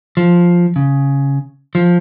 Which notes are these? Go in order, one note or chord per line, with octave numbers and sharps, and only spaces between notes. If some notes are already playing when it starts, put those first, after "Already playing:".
F3
C#3
F3